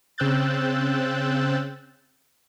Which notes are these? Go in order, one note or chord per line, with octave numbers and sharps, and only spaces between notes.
C#3 C4 E6 F#6 G6 A6